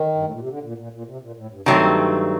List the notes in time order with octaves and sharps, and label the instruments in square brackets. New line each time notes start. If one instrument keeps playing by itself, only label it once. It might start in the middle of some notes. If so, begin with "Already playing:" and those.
Already playing: [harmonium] D#3
G2
A2
A#2
C3
D3
A#2
A#2
A#2
C3
A#2
A2
G2
[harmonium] G2 [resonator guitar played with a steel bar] D#3 F#3 A3 C4